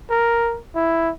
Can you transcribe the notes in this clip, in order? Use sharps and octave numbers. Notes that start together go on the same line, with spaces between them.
A#4
E4